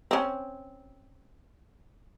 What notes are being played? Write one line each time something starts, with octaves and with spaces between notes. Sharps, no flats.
C4 C#4